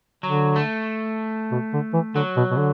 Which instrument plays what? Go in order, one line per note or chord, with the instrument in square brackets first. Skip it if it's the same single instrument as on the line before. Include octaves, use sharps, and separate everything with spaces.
[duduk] D3 [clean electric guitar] F#3
[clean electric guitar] A3
[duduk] B2
D3
E3
[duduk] D3 [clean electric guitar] F#3
[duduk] B2
B2
D3